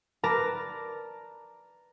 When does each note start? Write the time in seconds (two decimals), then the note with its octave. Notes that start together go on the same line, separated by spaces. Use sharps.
0.23 A#4 B4 D5 A5 A#5